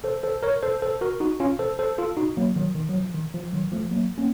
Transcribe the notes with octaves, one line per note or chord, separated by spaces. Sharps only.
A4 C5
A4 C5
A#4 C#5
A4 C5
A4 C5
F#4 A#4
D#4 F#4
C#4 F4
A4 C5
A4 C5
F4 A4
D#4 F#4
F#3 A#3
D#3 F#3
D#3
F#3
F3
D#3
F3
D#3 F#3
F3 A3
F#3 A#3
A#3 C#4